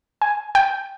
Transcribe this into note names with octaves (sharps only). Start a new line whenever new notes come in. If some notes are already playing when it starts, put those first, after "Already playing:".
G#5
G5